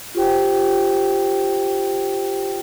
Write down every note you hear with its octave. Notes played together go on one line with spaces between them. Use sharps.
F4 G4 C5 G5